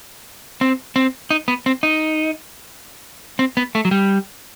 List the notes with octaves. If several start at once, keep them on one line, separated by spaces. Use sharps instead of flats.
C4
C4
D#4
B3
C4
D#4
C4
B3
A3
F#3
G3